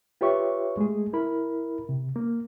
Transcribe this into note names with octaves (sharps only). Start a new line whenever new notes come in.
F4 G4 B4 C#5 E5 C#6
G#3 A3 G#4
E4 A#4 B5
C3
A#3